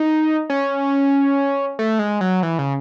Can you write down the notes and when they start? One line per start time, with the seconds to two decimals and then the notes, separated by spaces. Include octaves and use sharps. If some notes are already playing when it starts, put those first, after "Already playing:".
Already playing: D#4
0.50 C#4
1.79 A3
1.99 G#3
2.21 F#3
2.43 E3
2.59 C#3